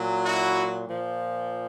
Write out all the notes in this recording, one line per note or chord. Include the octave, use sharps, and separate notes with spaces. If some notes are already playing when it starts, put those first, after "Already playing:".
Already playing: A#2 F#3
E4 F#4
A#2 F3